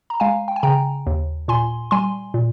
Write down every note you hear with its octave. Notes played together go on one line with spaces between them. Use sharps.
A#5
G#3 F5 G#5
G5
G#5
C#3 G5 A#5
D#2
A#2 G#5 C6
G3 G#5 C6
A#2